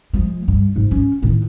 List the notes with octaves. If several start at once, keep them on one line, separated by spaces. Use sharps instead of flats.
F3 G#3
G2
G#2
C#4
A2 D#3